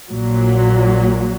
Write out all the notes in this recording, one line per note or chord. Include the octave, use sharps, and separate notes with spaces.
A#1 A#2 F#3